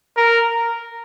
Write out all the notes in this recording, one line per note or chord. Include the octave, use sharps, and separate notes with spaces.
A#4